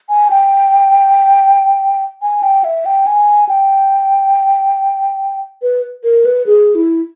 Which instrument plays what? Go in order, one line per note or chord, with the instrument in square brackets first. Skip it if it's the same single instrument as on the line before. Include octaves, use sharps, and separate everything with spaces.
[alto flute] G#5
G5
G#5
G5
E5
G5
G#5
G5
B4
A#4
B4
G#4
E4